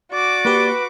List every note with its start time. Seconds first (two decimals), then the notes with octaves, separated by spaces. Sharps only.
0.12 F#4 D5 D6
0.45 A#3 G4 B4